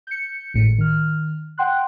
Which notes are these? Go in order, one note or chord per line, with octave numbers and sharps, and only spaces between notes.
G6 C#7
G#1 A2 C#7
D#3 F6
F#5 G5 C6 F#6